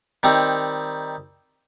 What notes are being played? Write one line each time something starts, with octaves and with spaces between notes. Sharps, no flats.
D#3 G3 C4 D#4